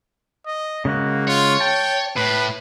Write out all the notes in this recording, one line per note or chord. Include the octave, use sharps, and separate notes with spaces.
D#5
C#3 G#3 A#3 F#4
F4 C#5
G5 A5
A2 B4